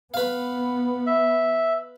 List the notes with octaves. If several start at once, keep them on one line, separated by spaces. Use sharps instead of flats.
B3 B4 F5
E5